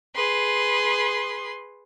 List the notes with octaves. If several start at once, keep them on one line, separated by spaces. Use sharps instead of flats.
G#4 B4 C6